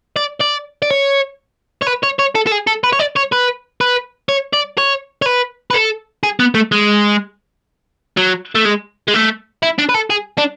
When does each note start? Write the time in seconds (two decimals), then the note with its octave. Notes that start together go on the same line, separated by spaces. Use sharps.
0.16 D5
0.41 D5
0.82 D5
0.90 C#5
1.82 C#5
1.87 B4
2.03 C#5
2.19 C#5
2.35 A4
2.47 A4
2.51 G#4
2.67 A4
2.84 B4
2.93 C#5
2.99 D5
3.16 C#5
3.32 B4
3.81 B4
4.29 C#5
4.53 D5
4.78 C#5
5.22 C#5
5.26 B4
5.71 B4
5.74 A4
6.23 G#4
6.40 B3
6.55 A3
6.72 G#3
8.17 F#3
8.55 A3
8.65 G#3
9.08 G#3
9.14 A3
9.63 E4
9.79 D4
9.89 B4
9.94 A4
10.10 G#4
10.38 D4